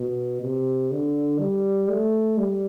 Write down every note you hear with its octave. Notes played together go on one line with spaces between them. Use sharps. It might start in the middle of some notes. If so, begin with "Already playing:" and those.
Already playing: B2
C3
D3
G3
A3
G3